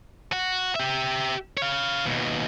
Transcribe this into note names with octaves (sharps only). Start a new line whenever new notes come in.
F#4
G4 E5
C#5 F5
D#2 B2